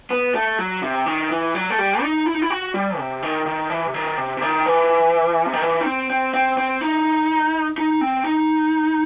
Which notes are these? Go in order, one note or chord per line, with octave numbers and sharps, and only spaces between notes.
B3
A3
F#3
C3
D#3
E3
F#3
A3
G3
D#4
E4
D#4
E4
F#4
G3
C3
D#3
D#3
E3
C3
D#3
C3
C3
D#3
E3
C3
D#3
E3
D#4
C4
C4
C4
C4
D#4
D#4
C4
D#4